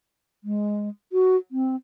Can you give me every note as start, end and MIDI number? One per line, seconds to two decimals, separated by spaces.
0.44 0.89 56
1.13 1.36 66
1.52 1.76 60